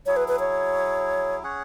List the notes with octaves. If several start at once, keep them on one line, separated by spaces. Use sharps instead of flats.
F#3 E4 G#4 C#5
B4
B4
C#5
C#4 G#4 C#5 F#5